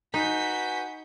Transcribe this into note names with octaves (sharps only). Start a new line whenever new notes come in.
D#4 F#4 B4 G#5 G6 B6